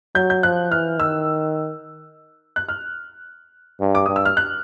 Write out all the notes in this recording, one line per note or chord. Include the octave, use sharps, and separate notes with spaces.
F#3 G6
G6
F3 F#6
E3 F6
D#3 E6
F#6
F6
G2
D6
G2 D#6
E6
F6
F#6